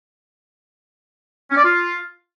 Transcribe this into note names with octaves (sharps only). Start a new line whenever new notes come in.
C#4
D5
F4